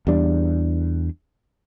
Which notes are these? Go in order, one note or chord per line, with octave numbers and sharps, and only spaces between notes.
E2 G3 D4